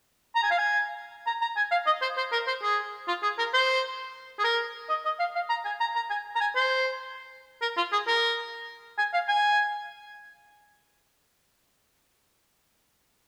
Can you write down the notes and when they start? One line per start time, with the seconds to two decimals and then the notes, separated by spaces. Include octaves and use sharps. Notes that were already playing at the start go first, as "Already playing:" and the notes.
0.35 A#5
0.43 G#5
0.51 F5
0.58 G#5
1.27 A#5
1.41 A#5
1.56 G#5
1.71 F5
1.86 D#5
2.02 C5
2.17 C5
2.32 A#4
2.47 C5
2.63 G#4
3.08 F4
3.23 G#4
3.38 A#4
3.54 C5
4.39 G#4
4.44 A#4
4.89 D#5
5.05 D#5
5.19 F5
5.35 F5
5.50 A#5
5.65 G#5
5.80 A#5
5.96 A#5
6.10 G#5
6.35 A#5
6.41 G#5
6.56 C5
7.62 A#4
7.77 F4
7.92 G#4
8.07 A#4
8.98 G#5
9.13 F5
9.28 G#5